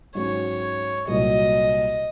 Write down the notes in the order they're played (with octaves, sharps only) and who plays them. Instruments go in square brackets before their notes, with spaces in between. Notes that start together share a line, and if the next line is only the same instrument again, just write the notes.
[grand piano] G#2 F#3 C#4 [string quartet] C#5
[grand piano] C2 A#2 F#3 A#3 [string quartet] D#5